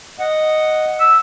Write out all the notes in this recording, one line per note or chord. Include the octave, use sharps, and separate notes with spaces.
D#5 F#5
E6